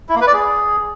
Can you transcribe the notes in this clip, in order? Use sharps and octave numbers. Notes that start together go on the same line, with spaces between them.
E4
A#3
B4
D5
G#4